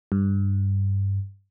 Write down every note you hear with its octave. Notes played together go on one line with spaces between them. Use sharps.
G2